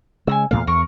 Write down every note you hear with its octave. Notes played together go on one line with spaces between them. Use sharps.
C#3 G#3 G#5 A#5 E6
E2 A#2 A3 F5
E2 A#4 C#6